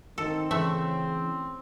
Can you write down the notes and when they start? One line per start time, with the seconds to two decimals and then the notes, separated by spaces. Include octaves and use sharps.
0.18 D#3 C4 A4
0.51 C#3 E3 A3 E5